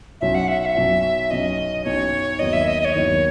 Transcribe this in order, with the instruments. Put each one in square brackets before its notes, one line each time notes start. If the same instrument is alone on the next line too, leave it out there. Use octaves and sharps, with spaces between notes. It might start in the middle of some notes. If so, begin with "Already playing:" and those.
[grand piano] B1 B2 F#3 C#4 [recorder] E5
[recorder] F#5
E5
F#5
E5
[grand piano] B1 B2 F#3 C#4
[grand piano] B1 B2 F#3 C#4 [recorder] D#5
[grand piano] B1 B2 F#3 C#4 [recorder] C#5
[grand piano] D#2 D#3 F#3 B3 [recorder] D#5
[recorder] E5
D#5
D#5
C#5
[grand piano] D#2 D#3 F#3 B3